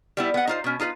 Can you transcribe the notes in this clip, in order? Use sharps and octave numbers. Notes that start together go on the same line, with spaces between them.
G3 B3 E4
B3 F#5
D#4 F4 C5
B2 C#4
D#4 F4 A4 B4